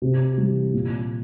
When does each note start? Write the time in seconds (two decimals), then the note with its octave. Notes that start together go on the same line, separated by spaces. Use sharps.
0.02 C3
0.38 E3 G3
0.73 A#2